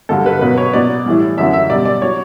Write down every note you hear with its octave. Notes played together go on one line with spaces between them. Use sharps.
G2 D3 F#3 A4
B4
B2 F#3 B4
C#5
B2 F#3 D5
A2 E3 G3
F#2 D3 F#3 E5
E5
B2 G3 D5
D5
F#3 C#5